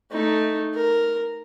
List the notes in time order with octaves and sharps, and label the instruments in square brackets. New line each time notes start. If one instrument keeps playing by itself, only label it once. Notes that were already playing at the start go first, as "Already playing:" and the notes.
[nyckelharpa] A3 D#4
A#4